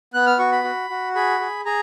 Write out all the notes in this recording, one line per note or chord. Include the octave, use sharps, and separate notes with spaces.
B3 F#6
F6
F#4 C#6
B5
F#4
F#4
G#4 B5
G#4
G#4 A#5